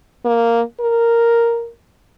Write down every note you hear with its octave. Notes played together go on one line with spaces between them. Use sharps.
A#3
A#4